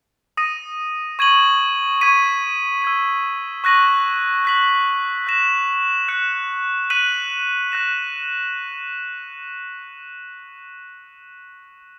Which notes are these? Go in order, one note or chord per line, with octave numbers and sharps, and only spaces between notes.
D#6 A#6 D#7
C#6 G#6 D#7 F#7
C#6 G#6 B6 D#7 F#7
E6 G#6 D#7
C#6 F#6 A#6 D#7 F#7
F#6 B6 F#7
F#6 A#6 E7
F#6 C#7 E7
F#6 B6 D#7 F#7
F#6 A#6 E7